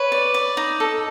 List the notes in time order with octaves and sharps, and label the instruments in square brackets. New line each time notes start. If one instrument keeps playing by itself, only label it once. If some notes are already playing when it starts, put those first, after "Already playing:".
Already playing: [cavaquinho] B4 [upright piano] C#5
[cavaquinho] D5
D5
D#4
A4